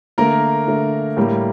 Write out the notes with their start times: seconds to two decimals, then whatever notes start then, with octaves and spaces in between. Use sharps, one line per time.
0.18 D3 A3 A#3 A#4
0.68 D3 A3
1.17 A2 G3 A#3